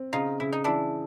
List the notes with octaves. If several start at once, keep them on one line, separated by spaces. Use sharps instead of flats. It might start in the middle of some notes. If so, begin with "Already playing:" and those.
Already playing: C4
C#3 D#4 F4
C#3 E4
D#4
E3 D4 E4